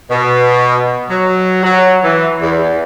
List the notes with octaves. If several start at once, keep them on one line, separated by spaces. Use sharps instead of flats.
B2
F#3
F#3
E3
E2